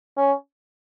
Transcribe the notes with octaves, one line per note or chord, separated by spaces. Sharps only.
C#4